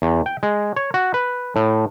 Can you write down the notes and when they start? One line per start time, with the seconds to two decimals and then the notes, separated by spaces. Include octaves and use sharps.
0.02 E2
0.26 G5
0.43 G#3
0.76 C#5
0.94 F#4
1.14 B4
1.56 A2